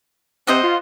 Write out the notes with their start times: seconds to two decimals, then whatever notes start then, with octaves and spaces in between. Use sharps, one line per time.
0.47 C3 C4 C5 D#5 F#5
0.63 F4